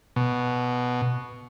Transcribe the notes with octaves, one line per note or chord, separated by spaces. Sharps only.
B2